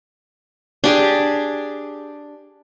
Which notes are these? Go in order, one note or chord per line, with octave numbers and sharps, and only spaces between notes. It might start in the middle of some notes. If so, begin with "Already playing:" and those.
D4 G4 G#4